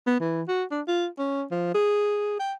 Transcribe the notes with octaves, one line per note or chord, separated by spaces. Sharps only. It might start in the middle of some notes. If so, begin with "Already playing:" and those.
B3
E3
F#4
D4
F4
C#4
F3
G#4
G5